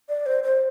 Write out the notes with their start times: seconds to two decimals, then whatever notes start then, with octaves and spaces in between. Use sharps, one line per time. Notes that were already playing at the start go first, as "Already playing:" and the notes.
0.09 D5
0.26 C5
0.43 C5